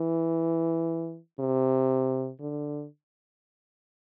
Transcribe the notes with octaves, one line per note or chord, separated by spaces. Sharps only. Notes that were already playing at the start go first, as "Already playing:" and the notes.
Already playing: E3
C3
D3